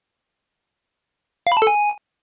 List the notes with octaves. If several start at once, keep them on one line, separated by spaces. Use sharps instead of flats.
F5
B5
A5
A4
G#5